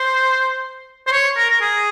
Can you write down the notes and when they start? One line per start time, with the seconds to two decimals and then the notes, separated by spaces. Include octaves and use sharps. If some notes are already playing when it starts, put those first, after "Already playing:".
Already playing: C5
1.07 C5
1.12 C#5
1.37 A#4
1.50 A#4
1.61 G#4